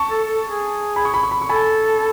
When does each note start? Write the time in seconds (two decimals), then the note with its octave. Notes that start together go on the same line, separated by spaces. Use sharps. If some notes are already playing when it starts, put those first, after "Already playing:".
Already playing: A5 C#6
0.10 A4
0.27 A4
0.45 G#4
0.96 B5
1.05 C#6
1.14 B5
1.23 C#6
1.31 B5
1.41 C#6
1.48 A4 G#5 B5